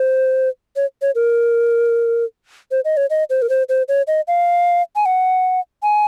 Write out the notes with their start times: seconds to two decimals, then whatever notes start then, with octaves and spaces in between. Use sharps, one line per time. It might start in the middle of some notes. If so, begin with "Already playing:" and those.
Already playing: C5
0.76 C#5
1.02 C#5
1.15 A#4
2.71 C5
2.85 D#5
2.97 C#5
3.10 D#5
3.30 C5
3.42 A#4
3.49 C5
3.69 C5
3.88 C#5
4.07 D#5
4.28 F5
4.96 G#5
5.06 F#5
5.83 G#5